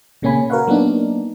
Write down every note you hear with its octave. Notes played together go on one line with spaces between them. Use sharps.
A#2 C#3 A#3 C#4 G#5 B5
F#4 A#4 B4 C#5 F5 F#5
F#3 A#3 B3 D4 D#4